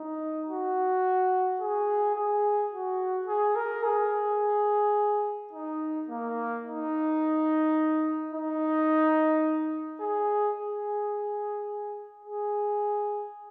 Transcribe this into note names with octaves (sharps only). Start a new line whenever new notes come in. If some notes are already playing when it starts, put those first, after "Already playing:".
Already playing: D#4
F#4
G#4
G#4
F#4
G#4
A#4
G#4
D#4
A#3
D#4
D#4
G#4
G#4
G#4